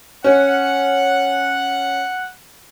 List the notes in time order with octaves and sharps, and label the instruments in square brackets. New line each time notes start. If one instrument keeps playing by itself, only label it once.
[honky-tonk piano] C#4 [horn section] F#5